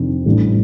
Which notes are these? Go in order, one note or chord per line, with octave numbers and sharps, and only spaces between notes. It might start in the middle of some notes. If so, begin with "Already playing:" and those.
Already playing: F2 C3 D#3 D4
A1 A2 G3 D4